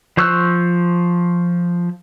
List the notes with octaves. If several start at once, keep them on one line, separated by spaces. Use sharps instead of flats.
F3 C5 C#6 E6 F#6